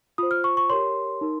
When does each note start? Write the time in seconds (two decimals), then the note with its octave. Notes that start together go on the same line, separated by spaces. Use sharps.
0.18 F4 C5 D#6
0.31 F6
0.44 C#6
0.57 C#6
0.70 G4 A#4 C#5 C6
1.21 D#4 A#4